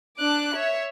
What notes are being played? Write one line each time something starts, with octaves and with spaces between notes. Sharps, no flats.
D4 D6 F#6
C#5 E5